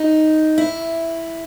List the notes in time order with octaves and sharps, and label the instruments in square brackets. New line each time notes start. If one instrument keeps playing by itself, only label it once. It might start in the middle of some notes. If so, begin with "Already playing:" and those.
Already playing: [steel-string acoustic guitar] D#4
E4